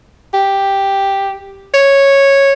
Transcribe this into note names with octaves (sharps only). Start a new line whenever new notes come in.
G4
C#5